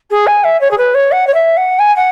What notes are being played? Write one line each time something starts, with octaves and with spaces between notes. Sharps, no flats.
G#4
G#5
E5
C#5
G#4
B4
C#5
F#5
C#5
E5
F#5
G#5
F#5